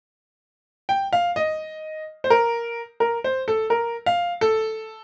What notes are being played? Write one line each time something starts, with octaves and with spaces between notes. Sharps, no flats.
G5
F5
D#5
C5
A#4
A#4
C5
A4
A#4
F5
A4